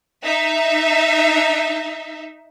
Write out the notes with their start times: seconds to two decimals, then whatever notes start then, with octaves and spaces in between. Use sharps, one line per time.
0.23 D#4 E5